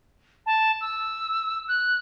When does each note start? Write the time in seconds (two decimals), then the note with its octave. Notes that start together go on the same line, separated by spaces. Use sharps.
0.46 A5
0.81 E6
1.68 F#6